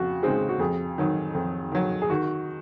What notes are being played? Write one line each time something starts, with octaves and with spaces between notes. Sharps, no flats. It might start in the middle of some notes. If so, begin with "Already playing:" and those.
Already playing: F2 C#3 F#4
C#3 G#3 C4 D#4
F#4
F2 G#4
D#3 F#3
F2
D#3 F#3
G#4
D#3 F#4